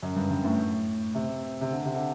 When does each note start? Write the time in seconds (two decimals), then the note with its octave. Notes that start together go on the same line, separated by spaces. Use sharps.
0.03 F#2
0.16 G2
0.31 G2
0.45 A2
1.15 C3
1.61 C3
1.71 D3
1.85 C3
1.95 D3